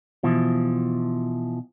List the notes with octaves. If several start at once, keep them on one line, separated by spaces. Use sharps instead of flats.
B2 E3 F3